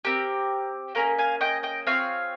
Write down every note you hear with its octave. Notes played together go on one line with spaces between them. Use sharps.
C4 G4 A#4
A#3 C#4 G#4 A#4
F5 G#5
D#5 G5
D#5 G5
C4 F4 G#4 C#5 F5